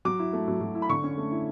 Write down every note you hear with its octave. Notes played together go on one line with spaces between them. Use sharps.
F#3 D6
E4
A3
F#3
F#3
E4
B5
D3 C#6
C#4
A3
E4